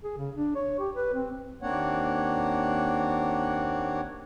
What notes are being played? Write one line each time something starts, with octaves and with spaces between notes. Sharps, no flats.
G#4
C#3
D4
C#5
G4
B4
C4
D#2 A#3 C4 D4 C#5 F#5